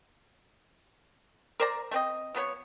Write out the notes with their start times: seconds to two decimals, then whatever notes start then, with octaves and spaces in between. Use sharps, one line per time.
1.60 A#4 C5 D5 A#5
1.91 A3 C4 D#5
2.35 F3 B3 B4 C#5